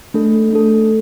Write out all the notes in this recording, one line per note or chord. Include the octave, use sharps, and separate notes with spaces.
A3 D4 A4
A3 D4 A4